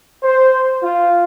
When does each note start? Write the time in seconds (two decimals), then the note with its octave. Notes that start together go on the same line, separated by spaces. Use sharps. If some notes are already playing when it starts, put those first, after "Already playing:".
0.23 C5
0.82 F4